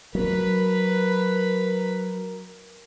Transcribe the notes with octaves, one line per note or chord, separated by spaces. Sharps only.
F#3 A#4 B4 B5